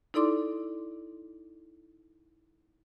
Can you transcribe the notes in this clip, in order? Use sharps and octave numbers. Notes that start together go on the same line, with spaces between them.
D#4 E4 A4 D5 C6 D6